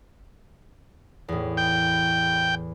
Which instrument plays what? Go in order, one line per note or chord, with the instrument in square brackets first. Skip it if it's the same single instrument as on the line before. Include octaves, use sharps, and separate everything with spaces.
[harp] E2 A2
[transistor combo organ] G5